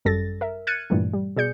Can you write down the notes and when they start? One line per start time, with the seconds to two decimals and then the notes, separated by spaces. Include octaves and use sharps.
0.05 G#1 F#2 G3 A4 A6 A#6
0.41 A#4 E5
0.67 F6 F#6 G#6 A6 C#7 D#7
0.90 G2 A#2 E3 G3 A3
1.13 G3
1.37 B2 G#4 D5 G6 C#7